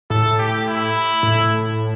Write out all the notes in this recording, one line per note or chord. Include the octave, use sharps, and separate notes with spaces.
A2 A4
G4
E4
A2